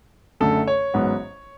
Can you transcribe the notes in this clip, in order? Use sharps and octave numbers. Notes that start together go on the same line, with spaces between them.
F#1 F#2 D3 A3 A4
C#5
A1 G#2 F#3 B3